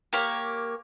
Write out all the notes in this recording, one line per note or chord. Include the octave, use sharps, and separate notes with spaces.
A#3 G4 C#5